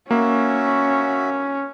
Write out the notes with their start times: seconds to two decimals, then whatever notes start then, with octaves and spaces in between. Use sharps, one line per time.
0.11 A#3 C#4 F#4 E5